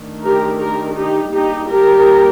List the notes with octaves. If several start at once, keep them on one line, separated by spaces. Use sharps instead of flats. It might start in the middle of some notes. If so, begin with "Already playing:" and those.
Already playing: D#3 A3 D4
G4 A#4
G4 A#4
D#4 G4
G3 A#3 D4 D#4 G4
G4 A#4